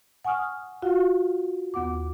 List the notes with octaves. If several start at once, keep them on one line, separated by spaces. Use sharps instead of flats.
F#5 G#5 C#6 D#6 F6
F4 F#4 F5 F#5
D#2 B3 F#5 D6